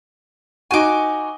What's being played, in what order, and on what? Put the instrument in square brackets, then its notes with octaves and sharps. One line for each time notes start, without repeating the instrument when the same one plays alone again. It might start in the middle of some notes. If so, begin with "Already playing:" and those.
[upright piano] D#4 F#4 C#6 [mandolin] G#5 D6